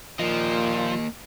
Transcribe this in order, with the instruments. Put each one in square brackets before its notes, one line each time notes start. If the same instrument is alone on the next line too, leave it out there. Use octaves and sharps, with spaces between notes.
[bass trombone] A#2 [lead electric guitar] F3 [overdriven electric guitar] A#3 D#5